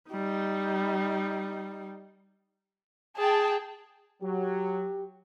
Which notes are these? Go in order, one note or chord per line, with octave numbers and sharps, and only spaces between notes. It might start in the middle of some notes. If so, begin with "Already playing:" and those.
G3 D#4
G#4 G5 A5
F#3 G4